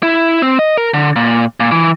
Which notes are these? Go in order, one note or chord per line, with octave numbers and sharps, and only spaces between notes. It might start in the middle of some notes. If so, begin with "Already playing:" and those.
E4
C4
D#5
A#4
D3
A#2
A#2
E3